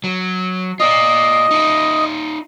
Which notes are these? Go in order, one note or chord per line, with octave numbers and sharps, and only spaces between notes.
F#3
F4 D5 D#5
D#4 F4